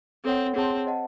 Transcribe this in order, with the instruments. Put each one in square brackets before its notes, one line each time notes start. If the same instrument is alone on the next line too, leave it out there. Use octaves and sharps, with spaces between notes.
[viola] C4 [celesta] A4 C#5 F#5
[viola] C4 [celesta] G#4 C#5 F#5 A5 C6
[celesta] C5 D#5 F#5 A5